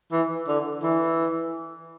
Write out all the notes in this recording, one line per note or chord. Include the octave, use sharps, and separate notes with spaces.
E3
D3
E3